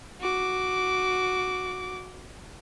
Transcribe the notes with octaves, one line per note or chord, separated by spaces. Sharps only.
F#4 D6